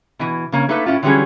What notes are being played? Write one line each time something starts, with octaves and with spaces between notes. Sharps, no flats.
B2 E3
C#3 A#3 C#4
A3 A#3 D#4 A4 B4
A2 C#4 E4 F4
D3 E3 F#3 G3 C#4 G#4